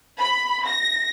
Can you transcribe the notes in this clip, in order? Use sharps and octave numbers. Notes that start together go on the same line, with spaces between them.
B5
A#6